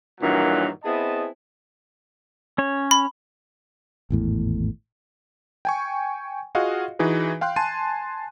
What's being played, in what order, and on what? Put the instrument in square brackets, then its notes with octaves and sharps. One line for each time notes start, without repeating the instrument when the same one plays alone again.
[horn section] G2 A#2 D#3 E3 F#3
B3 C4 E4 G#4 D#5 A5
[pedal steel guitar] C#4 C#5
[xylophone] B5
[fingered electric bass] G#1 E2 A2
[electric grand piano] G5 G#5 C#6
F4 F#4 G#4 D#5 F5 F#5
E3 D#4 F#4 G#4 B4
F5 G5 C6 F#6
G#5 A5 C6 D#7